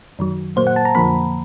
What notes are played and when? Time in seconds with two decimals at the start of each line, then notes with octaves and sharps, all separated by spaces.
0.19 F#2 D#3 F#3
0.56 A#2 F#3 A#3 C5
0.67 F#5
0.76 A5
0.85 A#5
0.95 F2 D3 F3 A#3 B5